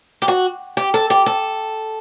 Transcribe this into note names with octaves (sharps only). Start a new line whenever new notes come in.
G4
F#4
G4
A4
G4
A4